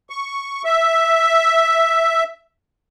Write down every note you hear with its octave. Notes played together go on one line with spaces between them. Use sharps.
C#6
E5